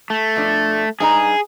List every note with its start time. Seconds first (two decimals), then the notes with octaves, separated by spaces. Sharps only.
0.10 A3
0.36 B2 F3 D4
1.00 G2 D#4 G#4 A#5